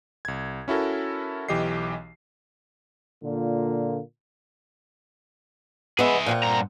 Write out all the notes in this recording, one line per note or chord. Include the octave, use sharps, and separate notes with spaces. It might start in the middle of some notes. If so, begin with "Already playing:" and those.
C2 G#6
C#4 E4 F#4 A4 A#4
B1 E3 G4 D#5 C7
A#2 D3 A#3 F4
G#3 B3 G#4 E5
A#2 C4 F#5
G2 A#5